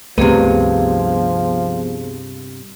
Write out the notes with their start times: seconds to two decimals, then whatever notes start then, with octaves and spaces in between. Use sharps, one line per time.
0.18 C#2 G2 C3 F3 A3 B3 G#4 B4